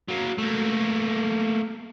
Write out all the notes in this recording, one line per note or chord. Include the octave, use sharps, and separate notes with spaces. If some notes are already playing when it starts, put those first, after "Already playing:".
F#3 A#3
A3 A#3